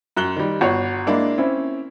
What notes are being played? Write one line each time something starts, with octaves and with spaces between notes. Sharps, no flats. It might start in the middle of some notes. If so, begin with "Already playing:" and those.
F#2 F#6 G7
D#3 G3
G1 F#4 C#5 C#6
G#3 A#3 D4 E4
C4 C#4 E4